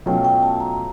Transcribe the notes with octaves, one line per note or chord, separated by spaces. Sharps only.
B2 F#3 A3 C#4 F4 G5
G5
A5
A#5